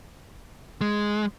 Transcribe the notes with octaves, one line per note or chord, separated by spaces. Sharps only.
G#3